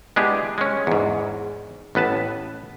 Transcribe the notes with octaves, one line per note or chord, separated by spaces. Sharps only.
G#3 B3 D4 E4 G4 G#4
G#3 C#4
E2 G#2
A1 B3 B4 A5